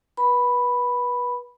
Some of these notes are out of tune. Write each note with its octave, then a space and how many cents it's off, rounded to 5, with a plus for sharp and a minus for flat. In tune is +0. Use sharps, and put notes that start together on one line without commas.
B4 -25 B5 +0